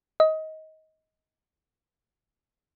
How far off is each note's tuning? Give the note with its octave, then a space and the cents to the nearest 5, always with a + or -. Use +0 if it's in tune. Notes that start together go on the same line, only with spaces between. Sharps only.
D#5 +20